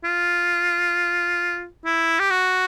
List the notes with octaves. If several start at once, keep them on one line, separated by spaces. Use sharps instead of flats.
F4
E4
G4
F#4